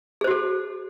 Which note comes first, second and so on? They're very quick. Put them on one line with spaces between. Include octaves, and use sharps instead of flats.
G#4 C5 F#4 A4